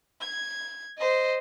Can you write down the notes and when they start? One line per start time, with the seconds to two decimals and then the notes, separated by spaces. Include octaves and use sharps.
0.21 G#6
0.98 C5 D#5